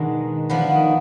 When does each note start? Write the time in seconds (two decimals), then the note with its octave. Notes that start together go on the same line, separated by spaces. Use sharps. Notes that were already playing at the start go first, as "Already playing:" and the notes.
Already playing: B2 D#3 G#3 D4
0.50 F3 B3 D4
0.71 D#3